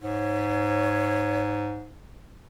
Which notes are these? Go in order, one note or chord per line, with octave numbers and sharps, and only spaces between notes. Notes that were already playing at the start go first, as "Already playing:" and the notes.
G#2 C#5